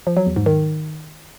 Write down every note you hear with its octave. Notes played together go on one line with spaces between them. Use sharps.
F3
F#3
E2
G#2
D#3